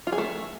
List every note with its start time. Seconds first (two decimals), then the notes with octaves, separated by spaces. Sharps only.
0.07 F4
0.12 G#4
0.18 A3